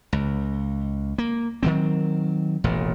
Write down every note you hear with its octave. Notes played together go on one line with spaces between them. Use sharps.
C#2
A#3
D#3 F#3 C4
E1 A1 A#2